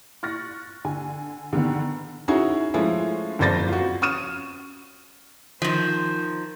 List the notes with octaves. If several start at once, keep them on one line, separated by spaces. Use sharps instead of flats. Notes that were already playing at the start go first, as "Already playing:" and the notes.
C#6 F6 F#6 A6 A#6
D3 G#5
D3 D#3 B3
C#4 D#4 E4 F#4 G#4
F3 G#3 A3 C#4 E4
F#1 F2 C5 D5 A6 A#6
F4 F#4
C#4 C#6 D#6 F6 D#7 E7
D#3 F3 C5